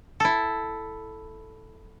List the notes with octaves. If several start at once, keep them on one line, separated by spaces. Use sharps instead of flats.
E4 A4